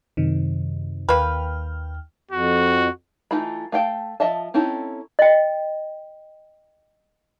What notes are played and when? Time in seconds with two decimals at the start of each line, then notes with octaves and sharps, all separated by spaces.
0.17 F#2 C3 D#3
1.09 D#2 A#3 B4 G5 F6
2.31 F2 F#4
3.31 E3 A3 D#4 F4 B5
3.72 A3 F5 G5 A5
4.20 F3 D#5 E5 A5
4.54 C4 C#4 D#4 E4 A4
5.19 D#5 G5